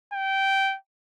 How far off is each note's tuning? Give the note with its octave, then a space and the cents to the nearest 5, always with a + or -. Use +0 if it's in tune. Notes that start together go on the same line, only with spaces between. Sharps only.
G5 -15